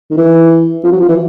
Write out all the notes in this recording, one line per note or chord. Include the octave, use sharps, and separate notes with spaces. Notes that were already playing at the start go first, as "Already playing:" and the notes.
D#3
E3
F3
F#3
F3
E3